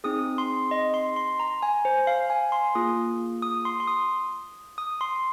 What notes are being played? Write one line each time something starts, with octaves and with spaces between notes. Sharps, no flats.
C4 D#4 G#4 D#6
C6
D#5
C6
C6
A#5
G#5
C5
F5
G#5
C6
A#3 F4 G#4 D#6
D#6
C6
C6
D#6
D#6
C6